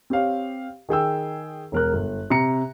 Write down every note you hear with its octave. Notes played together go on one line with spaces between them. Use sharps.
C4 G4 C#5 F5
D#3 G#4 G5 E6
E1 A#4 F#6
G1
C3 A#5 C#7